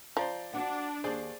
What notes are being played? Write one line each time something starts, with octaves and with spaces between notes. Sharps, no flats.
F3 C5 D5 A#5
D4 F#4 F#5
D#2 G#4 C5 D5